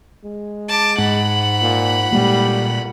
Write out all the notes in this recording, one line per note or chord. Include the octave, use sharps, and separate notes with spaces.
G#3
A5 D6
G#2 F#5 B5
A#2
A#2 G3 G#3 A#3